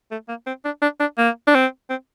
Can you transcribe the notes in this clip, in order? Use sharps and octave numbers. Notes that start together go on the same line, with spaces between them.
A3
A#3
C4
D4
D4
D4
A#3
D4
C4
C4